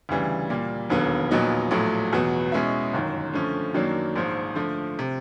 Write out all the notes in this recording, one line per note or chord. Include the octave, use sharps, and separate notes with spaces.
D2 C#3 E3 G3
A#2 G3 A#3
E1 D#2 D3 F#3 B3
A#1 A#2 F#3 B3 D#4
A#1 A2 F#3 A3
E2 B2 F#3 B3
B2 G#3 C#4 E4
G1 F#2 D#3
D3 F3 A3 C#4
F#2 D#3 F#3 A#3 D4
A#1 G#2 F3
D3 F3 A3
C3